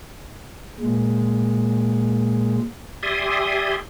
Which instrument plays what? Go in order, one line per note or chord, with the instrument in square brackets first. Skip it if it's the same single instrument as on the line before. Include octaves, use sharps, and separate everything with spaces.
[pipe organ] A#2 G#3
[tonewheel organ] G4 D5 E5 G#5 C6 D#6